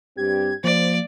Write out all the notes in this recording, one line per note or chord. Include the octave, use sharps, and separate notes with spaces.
G2 C4 G4 G#6
F3 A#3 C5 D5